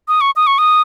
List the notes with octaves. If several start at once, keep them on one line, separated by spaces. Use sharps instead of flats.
D#6
C#6
D#6
C#6
D#6